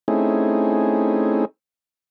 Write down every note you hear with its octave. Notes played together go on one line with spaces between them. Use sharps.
A3 C4 C#4 D#4 E4 G#4